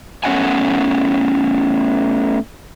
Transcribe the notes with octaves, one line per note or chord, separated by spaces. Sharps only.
A3 B3 C#4 D#5 F#5 G#5